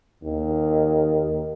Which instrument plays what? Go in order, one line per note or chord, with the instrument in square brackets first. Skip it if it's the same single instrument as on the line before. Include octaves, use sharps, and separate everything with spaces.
[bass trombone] D#2